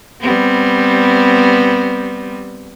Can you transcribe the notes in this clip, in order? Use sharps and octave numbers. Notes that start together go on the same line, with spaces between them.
G3 B3 C4